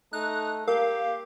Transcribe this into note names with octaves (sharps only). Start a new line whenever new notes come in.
A3 D#4 F#6
A#3 G4 A#4 F5